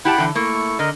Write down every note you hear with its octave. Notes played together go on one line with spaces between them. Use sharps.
E4 G4 F#5 G5 A5 B5
D3 E3
A3 A#3 E4 C#6
D3 A#4 D#5